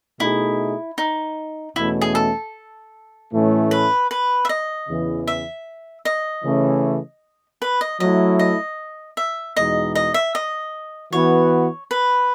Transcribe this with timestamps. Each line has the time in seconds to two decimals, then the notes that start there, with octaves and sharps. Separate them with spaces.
0.20 B2 A3 D#4 E4 G#4
0.98 D#4
1.76 E2 B2 A3 C#4 E4
2.01 G#4
2.15 A4
3.32 A2 E3 A3 C#4
3.71 B4
4.11 B4
4.45 E5
4.49 D#5
4.88 E2 C#3 E3
5.28 E5
6.05 D#5
6.44 C#3 E3 A3 C#4
7.62 B4
7.81 D#5
8.00 F#3 A3 E4 D#5
8.39 D#5
9.17 E5
9.56 E2 B2 G#3 D#4 D#5
9.95 D#5
10.14 E5
10.35 D#5
11.13 E3 B3 F#4 B4 C#5
11.91 B4